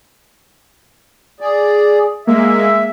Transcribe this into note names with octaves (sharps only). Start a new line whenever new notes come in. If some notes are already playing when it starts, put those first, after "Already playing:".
G#4 D5
G#3 A#3 E5